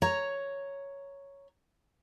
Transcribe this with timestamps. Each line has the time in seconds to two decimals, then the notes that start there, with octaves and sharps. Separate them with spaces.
0.02 C#5 A#5